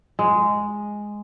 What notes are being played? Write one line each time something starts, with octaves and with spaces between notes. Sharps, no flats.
G#3